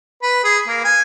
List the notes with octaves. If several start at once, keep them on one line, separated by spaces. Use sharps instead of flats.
B4
G#4
A#3
G#5